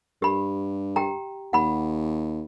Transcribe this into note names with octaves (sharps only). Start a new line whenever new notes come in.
G2 G4 B5
G4 G5 A#5
D#2 F#5 B5